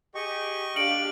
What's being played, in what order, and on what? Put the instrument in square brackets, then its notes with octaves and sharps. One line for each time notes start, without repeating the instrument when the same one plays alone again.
[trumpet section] G4 G#4 [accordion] D#5 C#6
[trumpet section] D4 [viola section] G4 F5 [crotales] D7 F#7